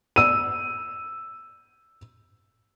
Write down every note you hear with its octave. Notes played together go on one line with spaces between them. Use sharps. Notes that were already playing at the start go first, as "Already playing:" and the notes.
E6 D#7